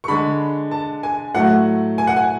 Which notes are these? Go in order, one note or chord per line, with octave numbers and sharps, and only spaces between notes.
C#6
D3 G#3 B5
A5
G#5
A2 F#3 A3 F#5
G#5
F#5
G#5